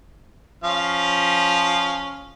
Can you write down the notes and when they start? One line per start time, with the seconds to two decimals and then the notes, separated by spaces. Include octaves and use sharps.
0.64 F3 C#4 F5